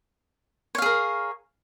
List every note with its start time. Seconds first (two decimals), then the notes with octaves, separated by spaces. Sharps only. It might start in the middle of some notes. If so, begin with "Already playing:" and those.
0.75 C#5
0.78 F5
0.82 G#4
0.86 A#4